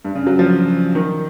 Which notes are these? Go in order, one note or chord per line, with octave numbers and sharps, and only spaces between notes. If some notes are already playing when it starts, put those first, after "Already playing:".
G2
C#3
F#3
F3
D#3